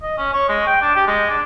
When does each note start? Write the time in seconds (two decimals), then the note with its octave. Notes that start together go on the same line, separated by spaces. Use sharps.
0.02 D#5
0.18 C#4
0.34 C#5
0.49 G#3
0.67 G5
0.82 D4
0.96 G4
1.07 G#3
1.30 D4